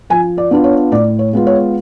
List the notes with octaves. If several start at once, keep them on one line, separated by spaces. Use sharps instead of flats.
F3 G#5
D5
B3 D4 F4
C#5
A2 D5
C#5
G#3 B3 F4
C#5